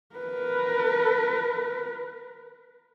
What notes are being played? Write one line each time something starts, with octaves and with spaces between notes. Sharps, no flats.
A#4 B4